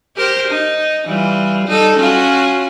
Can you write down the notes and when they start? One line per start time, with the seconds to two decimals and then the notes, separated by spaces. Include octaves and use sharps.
0.16 G4 A#4 C5
0.48 D#4
1.08 E3 G3 F4
1.66 G3 D#4 A4
1.98 C#4 F4 F#4